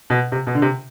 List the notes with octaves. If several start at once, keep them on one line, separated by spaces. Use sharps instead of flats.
B2
C3
B2
D3
C3